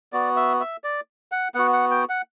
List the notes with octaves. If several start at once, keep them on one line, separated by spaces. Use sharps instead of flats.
B3 F#4 D5
E5
E5
D5
F#5
B3 F#4 F#5
F#5
G5
F#5